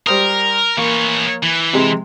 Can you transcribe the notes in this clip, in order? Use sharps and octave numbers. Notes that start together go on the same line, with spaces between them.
G3 A#4 C5 D#6
E3 A#3 C#5
E3
C3 G#3